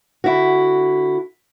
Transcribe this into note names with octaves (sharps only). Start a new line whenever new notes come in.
D3 E4 F#4